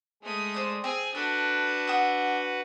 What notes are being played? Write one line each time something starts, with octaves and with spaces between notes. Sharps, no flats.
G#3 A3 D#6
C5 D5
C4 G#4
D4 F#4 A4 B4
F#5 D#6 E6